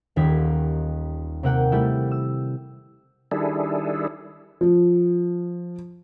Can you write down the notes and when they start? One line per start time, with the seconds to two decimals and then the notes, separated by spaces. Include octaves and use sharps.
0.16 D#1 D#2 G4 G#6 B6
1.43 C3 A#3 F#5 G5
1.72 G3 A3 E4 E6 G6
2.11 E6
3.31 D#3 G3 D4 E4 G#4 A4
4.61 F3